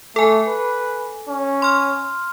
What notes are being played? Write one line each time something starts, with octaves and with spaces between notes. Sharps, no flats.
A3 A4 G#5
B4
C#4
C6 F6